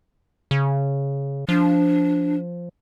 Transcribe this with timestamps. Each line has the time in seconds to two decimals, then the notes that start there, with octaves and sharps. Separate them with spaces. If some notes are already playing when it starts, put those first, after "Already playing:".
0.51 C#3
1.49 F3 D4